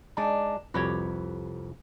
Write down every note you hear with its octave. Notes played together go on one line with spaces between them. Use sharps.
G#3 D4 D#4 A5
C2 F2 F#4 G4 B4 C#5